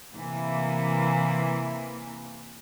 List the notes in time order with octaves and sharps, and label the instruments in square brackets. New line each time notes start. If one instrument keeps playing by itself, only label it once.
[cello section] C3 E3 A#3